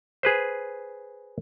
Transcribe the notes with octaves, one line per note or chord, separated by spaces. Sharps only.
G#4 B4 C5